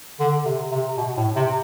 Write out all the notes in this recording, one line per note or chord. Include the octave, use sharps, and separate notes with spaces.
D3
C3
C3
B2
A2
C3